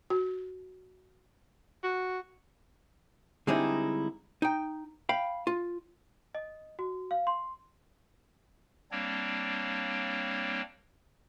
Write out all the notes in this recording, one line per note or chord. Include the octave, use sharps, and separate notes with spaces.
F#4
F#4
D3 G3 G#3 C4 D#4 E4
D#4 G5
F5 G5 B5
F4
D#5
F#4
F5
C6
G3 A#3 C4 D4 C#5